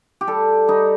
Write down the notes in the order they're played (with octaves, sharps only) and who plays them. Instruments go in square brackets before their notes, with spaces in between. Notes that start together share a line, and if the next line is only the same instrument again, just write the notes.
[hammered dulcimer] G4
G3 A4
G3 D#4